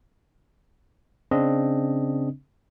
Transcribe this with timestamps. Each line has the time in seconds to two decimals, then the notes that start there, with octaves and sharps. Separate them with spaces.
1.31 C#3 C4 D4 D#5